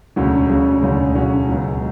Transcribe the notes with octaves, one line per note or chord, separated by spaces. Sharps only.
E1 D2 C#3 F#3 C#4
E1 D2 C#3 F#3 C#4
E1 D2 C#3 F#3 C#4
E1 D2 C#3 F#3 C#4
C#2 B2 F#3